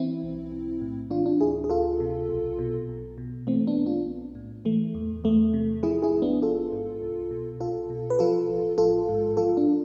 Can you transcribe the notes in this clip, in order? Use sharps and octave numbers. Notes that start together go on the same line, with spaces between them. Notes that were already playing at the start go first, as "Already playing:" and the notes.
Already playing: E3 C4 E4
B1
B1
A2
E3 D4 F4
D4 F4
D2 E4 G#4
G#4
D2 F4 A4
C3
B1
B2
B1
B2
E3 A3 C4
B3 D4
B1
D4 F4
B1
A2
E3 A3
E2
E2 A3
C3
F3 E4 G#4
E4 G#4
G#1
B3 D4
G#1 F4 A4
G#2
C2
B2
C2 F4 A4
B2
B4
F3 F4 A4
A1
A1 F4 A4
G#2
F3 F4 A4
D4 F4